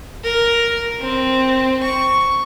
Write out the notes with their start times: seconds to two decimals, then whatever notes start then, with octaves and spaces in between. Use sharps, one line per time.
0.24 A#4
1.01 C4
1.83 C#6